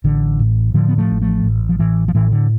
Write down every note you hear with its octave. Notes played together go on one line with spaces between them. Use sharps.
A1 D3
A2
A2 D3 F3
B3
F3 A3
A1
F3 A3
A1
F3
A2 E3
F3
A2 E3
D3